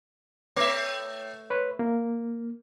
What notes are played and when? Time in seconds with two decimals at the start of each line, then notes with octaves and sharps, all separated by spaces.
0.56 A3 C#5 E5
1.50 B4 C#5
1.79 A#3